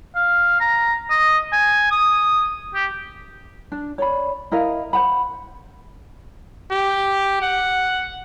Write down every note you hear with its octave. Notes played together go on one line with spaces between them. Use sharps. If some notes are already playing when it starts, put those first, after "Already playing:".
F5
A#5
D#5
G#5
D#6
G4
D4
C#5 D5 B5
E4 A#4 D#5 F5
C5 F#5 B5
G4
F#5